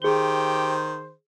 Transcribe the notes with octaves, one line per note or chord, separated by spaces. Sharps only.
D#3 G4 G#4 C5 G7